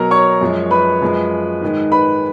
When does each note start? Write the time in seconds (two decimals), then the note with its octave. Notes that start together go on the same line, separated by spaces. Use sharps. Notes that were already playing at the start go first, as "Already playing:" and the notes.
Already playing: B2 F#3 A#4 A#5
0.11 C#5 C#6
0.41 F#2 F3 G#3
0.71 B4 B5
1.02 F#2 F3 G#3
1.61 G#2 D#3 G#3
1.92 B4 B5